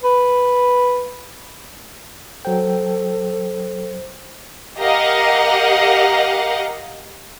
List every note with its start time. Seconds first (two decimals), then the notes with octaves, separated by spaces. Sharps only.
0.03 B4
2.45 F#3 A4 C5 G5
4.79 G4 A#4 D#5 F5 F#5